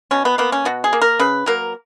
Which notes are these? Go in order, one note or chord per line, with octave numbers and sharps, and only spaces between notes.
B2 C#4
B3
A#3 B3
C#4
B2 F#4
G#4
A#3
A#4
C#3 B4
F#3 A#3 A#4